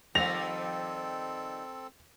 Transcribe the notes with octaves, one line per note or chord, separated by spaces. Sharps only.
D#3 F3 G3 C4 A4 A#6 F7